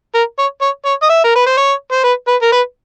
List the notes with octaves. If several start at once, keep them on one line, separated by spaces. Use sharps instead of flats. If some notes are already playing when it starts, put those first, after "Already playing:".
A#4
C#5
C#5
C#5
D#5
E5
A#4
B4
C5
C#5
C5
B4
B4
A#4
B4